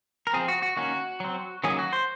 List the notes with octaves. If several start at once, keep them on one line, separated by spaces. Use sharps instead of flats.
A#4
F3 C4 G#4
F#4
F#4
D#3 A#3 C#4 F#4
F#3 C4
D#3 F#3 A#3 C#4 G#4
F#4
C5